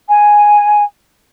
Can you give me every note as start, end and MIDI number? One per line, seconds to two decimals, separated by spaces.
0.09 0.83 80